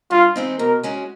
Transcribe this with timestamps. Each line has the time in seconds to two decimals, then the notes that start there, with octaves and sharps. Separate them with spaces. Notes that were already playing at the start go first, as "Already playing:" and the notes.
0.11 G2 F4
0.36 E3 G#3 C4 D#4
0.59 B2 A#4
0.83 G#3 C#4 F#4